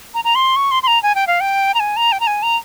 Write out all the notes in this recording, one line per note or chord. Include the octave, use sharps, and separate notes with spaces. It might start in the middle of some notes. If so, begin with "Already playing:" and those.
A#5
A#5
C6
C#6
C6
C6
A#5
G#5
G5
F5
G5
A#5
G#5
A#5
G5
A#5
G#5
A#5